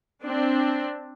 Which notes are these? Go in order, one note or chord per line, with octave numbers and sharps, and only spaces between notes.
C4 D4